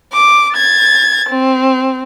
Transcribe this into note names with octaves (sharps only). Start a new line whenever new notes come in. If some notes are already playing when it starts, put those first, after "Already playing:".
D6
G#6 A6
C4